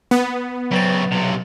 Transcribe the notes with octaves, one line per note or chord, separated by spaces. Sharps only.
B3
C#3 F#3 C4 B4 A6
B1 C3